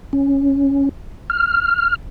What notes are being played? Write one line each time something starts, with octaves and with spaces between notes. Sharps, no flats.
C#4
F6